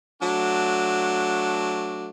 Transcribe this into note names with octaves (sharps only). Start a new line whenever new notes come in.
F#3 A3 D4 F#4